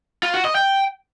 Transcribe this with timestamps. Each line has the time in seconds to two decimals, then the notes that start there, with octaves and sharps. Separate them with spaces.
0.23 F4
0.34 F#4
0.45 D#5
0.55 G5